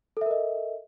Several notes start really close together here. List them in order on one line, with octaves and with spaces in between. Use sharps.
A4 E5 A#4 D#5